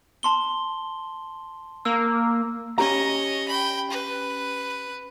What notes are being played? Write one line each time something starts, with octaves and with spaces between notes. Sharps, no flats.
A5 C6 G7
A#3 E6
C#4 G4 C#5 D#5 A#5
G5 B5
B4